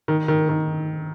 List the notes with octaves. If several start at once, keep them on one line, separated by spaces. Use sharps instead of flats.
D#3
D#3
D#3